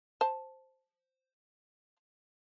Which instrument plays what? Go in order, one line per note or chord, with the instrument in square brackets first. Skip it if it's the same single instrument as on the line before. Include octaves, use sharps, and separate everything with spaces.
[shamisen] C5 A5